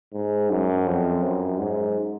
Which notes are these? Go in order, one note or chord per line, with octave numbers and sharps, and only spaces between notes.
G#2
F#2
F2
F#2
G#2